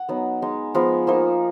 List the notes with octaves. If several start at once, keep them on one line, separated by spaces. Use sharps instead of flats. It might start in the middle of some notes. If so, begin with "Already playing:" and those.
Already playing: F#5
F#3 B3 D#4
G#3 D#4
F3 G#3 B3 A#5
F3 A#3 D#4